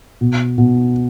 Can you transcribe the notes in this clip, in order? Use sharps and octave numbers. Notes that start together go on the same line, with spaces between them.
B2
B2